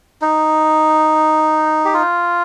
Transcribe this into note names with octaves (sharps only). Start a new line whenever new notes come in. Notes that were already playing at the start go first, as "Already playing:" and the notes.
D#4
G4
F4